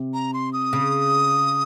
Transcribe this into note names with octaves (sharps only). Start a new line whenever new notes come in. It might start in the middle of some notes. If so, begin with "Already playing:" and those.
Already playing: C3
A#5
C6
D#6
C#3